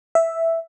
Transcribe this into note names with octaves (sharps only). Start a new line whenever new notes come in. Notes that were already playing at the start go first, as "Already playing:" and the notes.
E5